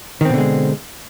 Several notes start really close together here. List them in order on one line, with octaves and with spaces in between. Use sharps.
D#3 C4 B2 D3 G#3